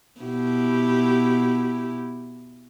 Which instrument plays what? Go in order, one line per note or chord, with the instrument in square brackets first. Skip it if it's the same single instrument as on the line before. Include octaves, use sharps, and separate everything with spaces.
[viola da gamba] B2 E4 G4